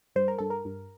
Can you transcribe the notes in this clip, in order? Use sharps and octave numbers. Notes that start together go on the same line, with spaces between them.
G2 C5
A#4
G2 A4
A#4
G2